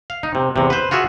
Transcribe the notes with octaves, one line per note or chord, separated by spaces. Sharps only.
F5
D#4
C3
E2 C3
B4 C5
F4 F#4 G#4 E5